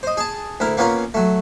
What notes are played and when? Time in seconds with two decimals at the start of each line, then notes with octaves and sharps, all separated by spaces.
0.03 C5 D#5
0.17 G#4 A5
0.60 D2 E4 A#4
0.77 A#3 B3 C#4 F4 A#4
1.14 F#3 A3